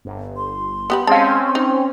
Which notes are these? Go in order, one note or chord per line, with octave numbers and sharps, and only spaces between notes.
G1
C6
B3 G4 B5
G#3 C4 C#4 F5 A5
D#4